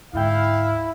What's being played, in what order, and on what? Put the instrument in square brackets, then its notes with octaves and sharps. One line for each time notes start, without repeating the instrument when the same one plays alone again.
[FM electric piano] D2 G#2 G5 [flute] E4 [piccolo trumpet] F5